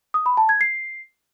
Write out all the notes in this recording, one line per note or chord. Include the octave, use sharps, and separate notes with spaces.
D#6
B5
A5
G#6
C7